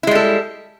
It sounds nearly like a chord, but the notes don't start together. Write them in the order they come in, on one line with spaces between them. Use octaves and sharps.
E4 G#3 G3 A4